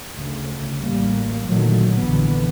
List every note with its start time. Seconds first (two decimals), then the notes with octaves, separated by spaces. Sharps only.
0.18 D2 C#3
0.81 A1 G3 A#3
1.48 A#2 D3 D#3 F#3 A3
1.99 A#1 D3 E3 B3